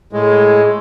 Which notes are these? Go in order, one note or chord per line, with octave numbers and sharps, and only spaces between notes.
A2 G#3